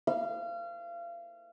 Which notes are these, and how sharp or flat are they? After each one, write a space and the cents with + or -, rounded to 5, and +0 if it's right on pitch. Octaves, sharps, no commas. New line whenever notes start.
F5 -30